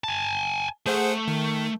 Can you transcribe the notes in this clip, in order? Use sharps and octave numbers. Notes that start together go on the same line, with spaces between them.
G#5 A5
A3 G#4 C5 F#5
D#3